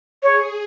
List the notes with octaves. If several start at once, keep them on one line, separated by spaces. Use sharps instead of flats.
G#4 C#5